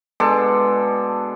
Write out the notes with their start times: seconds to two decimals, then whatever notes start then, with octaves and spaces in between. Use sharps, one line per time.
0.20 B2 G#3 D4 A4